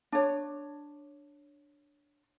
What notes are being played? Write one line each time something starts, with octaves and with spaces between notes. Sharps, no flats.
D4 C#5